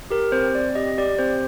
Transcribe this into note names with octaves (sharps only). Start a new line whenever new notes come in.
G4 A#4
C4 C5
C4 D5
G4 D#5
G4 D5
C4 C5